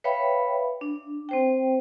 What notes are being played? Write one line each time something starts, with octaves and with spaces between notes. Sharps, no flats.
B4 C#5 E5 F5 G5 B5
D4
C4 C5 G5